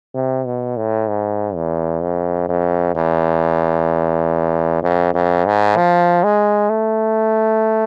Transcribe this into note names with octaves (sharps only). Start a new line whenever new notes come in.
C3
B2
A2
G#2
E2
F2
F2
E2
F2
F2
G#2
F3
G#3
A3